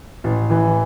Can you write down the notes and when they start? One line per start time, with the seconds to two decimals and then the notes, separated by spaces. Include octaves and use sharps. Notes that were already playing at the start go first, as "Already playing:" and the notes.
0.24 A1
0.50 E3